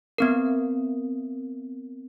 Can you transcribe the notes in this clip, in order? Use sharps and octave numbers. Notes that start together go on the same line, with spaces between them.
B3 C4 A#4